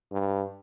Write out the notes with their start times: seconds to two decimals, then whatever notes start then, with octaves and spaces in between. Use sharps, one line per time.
0.12 G2